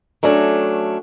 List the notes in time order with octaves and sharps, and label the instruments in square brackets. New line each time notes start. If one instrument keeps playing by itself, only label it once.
[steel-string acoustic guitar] F#3 A3 C#4 D4